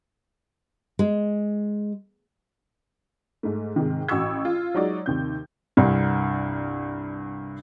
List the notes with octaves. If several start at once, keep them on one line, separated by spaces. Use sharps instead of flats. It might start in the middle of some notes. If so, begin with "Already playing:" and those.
G#3
G#2 A3
G#2 C3 D#3
A1 F#4 C#6 E6 G#6
F4
F#3 G#3 D#4 F#4 C#5 D5
D#2 C3 G6
C2 G2